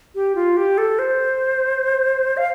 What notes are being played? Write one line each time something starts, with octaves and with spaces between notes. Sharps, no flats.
G4
F4
G4
A4
C5
F5